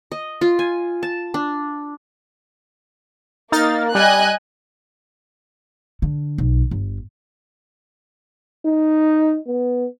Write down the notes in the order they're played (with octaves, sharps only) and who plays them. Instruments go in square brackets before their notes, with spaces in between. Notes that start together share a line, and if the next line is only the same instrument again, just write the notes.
[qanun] D#5
F4
G#5
A5
D4
[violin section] A#3 [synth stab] D#4 F6 A6
[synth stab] G3 [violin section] D#5 G#5 F#6
[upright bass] D3
B1
G1
[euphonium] D#4
B3